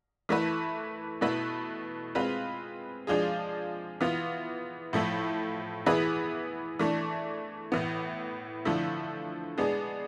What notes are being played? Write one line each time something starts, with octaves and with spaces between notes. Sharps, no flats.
E3 A3 E4 B4
B2 A3 E4 B4
G#3 C4 F4 B4
F3 G#3 D4 F4 G#4
E3 B3 F4
A2 F3 A3 E4
E3 B3 E4 G#4 B4
E3 A3 D4
A2 E3 B3
D3 F3 A3 E4
G#3 B3 D4 G#4